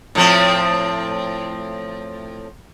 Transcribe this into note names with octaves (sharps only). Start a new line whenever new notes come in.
A2 F3 C4